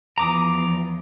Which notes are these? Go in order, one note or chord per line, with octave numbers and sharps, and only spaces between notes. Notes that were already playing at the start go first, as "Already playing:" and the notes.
E2 F3 A#5 D6 D#6